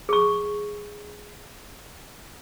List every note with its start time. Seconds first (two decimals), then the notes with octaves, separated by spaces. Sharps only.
0.09 G#4 C#6